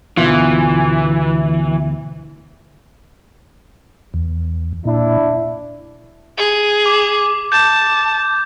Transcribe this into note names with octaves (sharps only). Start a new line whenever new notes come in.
D2 B2 E3 F4
E2
A#2 D4 E4
G#4
D6
A5 G6